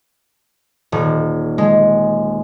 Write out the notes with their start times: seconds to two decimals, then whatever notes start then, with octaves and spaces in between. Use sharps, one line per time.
0.92 D#1
1.58 G#3